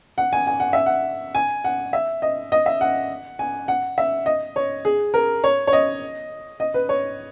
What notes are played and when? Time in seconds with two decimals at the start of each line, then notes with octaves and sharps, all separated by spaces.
0.18 F#5
0.33 G#5
0.47 G#5
0.60 F#5
0.73 E5
0.86 F#5
1.35 G#5
1.64 F#5
1.93 E5
2.22 D#5
2.52 D#5
2.66 E5
2.81 F#5
3.39 G#5
3.68 F#5
3.98 E5
4.26 D#5
4.56 C#5
4.85 G#4
5.14 A#4
5.44 C#5
5.67 C#5
5.73 D#5
6.60 D#5
6.74 B4
6.89 C#5